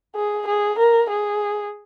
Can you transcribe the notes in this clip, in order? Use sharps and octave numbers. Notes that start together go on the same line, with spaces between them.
G#4
G#4
A#4
G#4